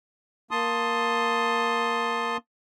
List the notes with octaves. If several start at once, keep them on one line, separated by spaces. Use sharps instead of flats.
A#3 A5 C6 D#6